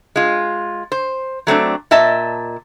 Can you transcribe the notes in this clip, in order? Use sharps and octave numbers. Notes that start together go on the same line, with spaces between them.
G#3 F4
C5
F#3 A3 C4 D4
A#2 D#5 E5 A5